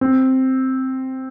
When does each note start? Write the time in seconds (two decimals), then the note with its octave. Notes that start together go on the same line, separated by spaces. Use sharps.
0.01 C4